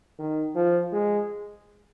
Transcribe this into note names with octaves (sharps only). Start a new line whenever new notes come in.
D#3
F3
G#3